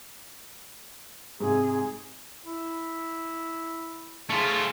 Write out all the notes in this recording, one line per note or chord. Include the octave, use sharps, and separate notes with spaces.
G#2 C3 G#4
E4
A3 F4 G#4